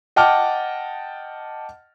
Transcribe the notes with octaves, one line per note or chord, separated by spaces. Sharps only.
D#5 F#5 G5 A5 D6 F6